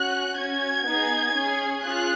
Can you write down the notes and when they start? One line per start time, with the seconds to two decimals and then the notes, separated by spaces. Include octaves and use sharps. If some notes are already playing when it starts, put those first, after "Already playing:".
Already playing: C#4 F#4 F#6
0.37 C#4 F#4 G#6
0.86 B3 D#4 G#4
1.34 C#4 G#4
1.83 C#4 F4 G#4 F#6